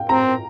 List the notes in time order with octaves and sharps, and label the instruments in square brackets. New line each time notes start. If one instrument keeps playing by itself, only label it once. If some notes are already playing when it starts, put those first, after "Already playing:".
Already playing: [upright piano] F5 G5
[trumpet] C4 [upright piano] A#5